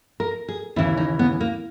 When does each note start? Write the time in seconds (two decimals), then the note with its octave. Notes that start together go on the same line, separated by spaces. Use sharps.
0.20 A#4
0.48 G#4
0.76 D#2 C#3 E3 E4
0.97 D#4
1.19 B3
1.41 A#3